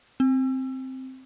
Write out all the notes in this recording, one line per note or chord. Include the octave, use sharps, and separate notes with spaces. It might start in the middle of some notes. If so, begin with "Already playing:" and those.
C4